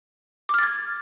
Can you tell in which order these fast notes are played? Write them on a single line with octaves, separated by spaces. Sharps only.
D6 F6 A6 G#6